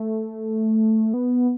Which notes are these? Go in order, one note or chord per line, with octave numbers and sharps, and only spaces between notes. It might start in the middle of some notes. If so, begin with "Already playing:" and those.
Already playing: A3
B3